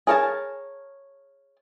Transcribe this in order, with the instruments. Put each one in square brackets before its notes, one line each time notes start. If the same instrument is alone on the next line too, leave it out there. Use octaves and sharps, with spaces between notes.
[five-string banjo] G#4 A#4 C#5 F5 A5